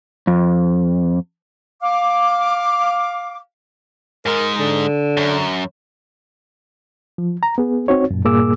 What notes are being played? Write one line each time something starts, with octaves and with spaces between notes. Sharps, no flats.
F2
F5 D6
G#2 G#3 A#4
D3
F#2
F3
A#5
B3 G#4
C4 D#4 F#4 C#5
F#2 A#2
G2 A#2 A#3 G#4 D6 E6